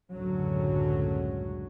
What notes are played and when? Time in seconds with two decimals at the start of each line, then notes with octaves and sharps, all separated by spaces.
0.12 F#1 C#2 A2 D3 F#3 C#4